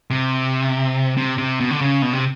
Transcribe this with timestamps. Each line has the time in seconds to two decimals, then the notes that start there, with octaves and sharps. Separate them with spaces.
0.10 C3
1.17 C3
1.38 C3
1.60 B2
1.71 D3
1.81 C#3
2.02 B2
2.13 C3